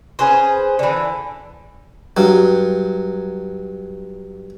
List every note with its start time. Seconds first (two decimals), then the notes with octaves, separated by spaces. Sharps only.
0.19 C#4 G#4 B4 C5
0.79 D3 E3
2.17 G2 F#3